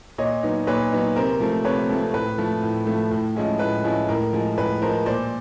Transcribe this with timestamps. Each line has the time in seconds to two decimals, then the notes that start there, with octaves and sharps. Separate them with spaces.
0.18 A#2 C#5 D#5
0.43 F#3 B3 D#4
0.67 A#2 B4 C#5
0.92 F#3 B3 D#4
1.16 C3 A#4 C5
1.40 F3 A3 C4
1.65 C3 B4 C#5
1.89 F3 A3 C4
2.13 A2 B4
2.38 F3 A3
2.62 A2
2.87 F3 A3
3.11 A2
3.35 F3 G#3 C#4 E4
3.59 A2 B4
3.84 F3 G#3 C#4 E4
4.09 A2 A#4
4.33 F3 G#3
4.57 A2 B4
4.82 F3 G#3 A#4 C5
5.06 A#2 C5 D5